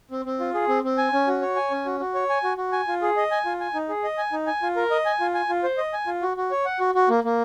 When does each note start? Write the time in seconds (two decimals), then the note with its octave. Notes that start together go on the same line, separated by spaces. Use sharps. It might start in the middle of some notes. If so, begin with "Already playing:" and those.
0.11 C4
0.25 C4
0.40 F4
0.54 G#4
0.68 C4
0.84 C4
0.98 G#5
1.13 C#4
1.27 F#4
1.42 C#5
1.56 G#5
1.71 C#4
1.85 F#4
2.00 F#4
2.14 C#5
2.29 G#5
2.44 F#4
2.58 F#4
2.72 G#5
2.88 F4
3.02 G#4
3.17 D#5
3.31 G#5
3.45 F4
3.60 G#5
3.74 D#4
3.89 G#4
4.04 D#5
4.18 G#5
4.32 D#4
4.47 G#5
4.62 F4
4.76 A#4
4.91 D#5
5.06 G#5
5.20 F4
5.34 G#5
5.49 F4
5.63 C5
5.78 D#5
5.93 G#5
6.07 F4
6.22 F#4
6.37 F#4
6.51 C#5
6.65 F#5
6.80 F#4
6.95 F#4
7.09 A#3
7.24 A#3